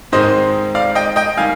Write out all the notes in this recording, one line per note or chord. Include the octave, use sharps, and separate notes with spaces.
G#2 D#3 G#3 C4 D#4 C5 D#5
D5 F5
D#5 G5
D#5 G5
D#3 G3 F5 G#5